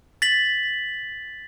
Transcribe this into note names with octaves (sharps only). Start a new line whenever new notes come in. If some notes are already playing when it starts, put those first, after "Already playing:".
A6 B6 F#7